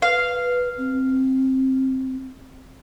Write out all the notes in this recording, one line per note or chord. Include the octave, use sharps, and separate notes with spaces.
B4 F5
C4